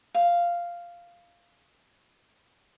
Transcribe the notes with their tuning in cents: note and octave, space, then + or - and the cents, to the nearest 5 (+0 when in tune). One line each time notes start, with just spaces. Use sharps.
F5 -5